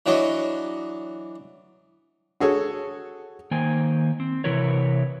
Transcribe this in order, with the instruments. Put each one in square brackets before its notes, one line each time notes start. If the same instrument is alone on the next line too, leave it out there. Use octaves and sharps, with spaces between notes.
[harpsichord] E3 F#3 D4 C#5 D#5
[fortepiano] F#4 G#4 A4 C#5
[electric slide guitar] D#3 A#3 C5 G5 G#5
C4
C3 E3 E4 A#4 B4 C#5